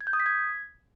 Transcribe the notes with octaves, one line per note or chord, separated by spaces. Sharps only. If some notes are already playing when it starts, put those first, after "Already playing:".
G#6
G6
D#6
B6
G#6